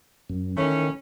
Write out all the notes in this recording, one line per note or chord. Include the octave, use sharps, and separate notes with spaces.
F#2
D#3 E3 A3 C#4